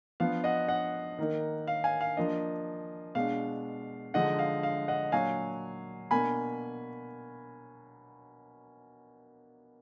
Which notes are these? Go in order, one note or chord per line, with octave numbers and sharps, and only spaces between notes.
F3 B3 D4 F5
D#5 F#5
D#5 F#5
D#3 A#3 D#4
F5
F5 G#5
F5
F3 A#3 D4 D#5
B2 G#3 D4 F5
D3 F3 G#3 D#4 D#5 F#5
F5
F5
D#5 F#5
A#2 F#3 D4 F5 G#5
B2 A#3 D4 G#5 B5